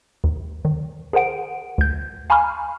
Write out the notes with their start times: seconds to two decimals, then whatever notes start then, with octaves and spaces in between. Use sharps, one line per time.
0.24 D#2
0.65 D#3
1.13 G#4 A#4 C5 F#5 D7
1.78 D2 G6
2.30 F5 G#5 A#5 B5 C#6 F6